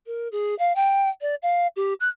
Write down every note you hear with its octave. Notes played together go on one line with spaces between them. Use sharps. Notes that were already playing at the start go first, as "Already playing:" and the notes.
A#4
G#4
F5
G5
D5
F5
G4
F#6